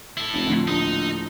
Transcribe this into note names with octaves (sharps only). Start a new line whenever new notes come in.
E4 A4
F1
D2 A2 D3 F3
A#1 D#4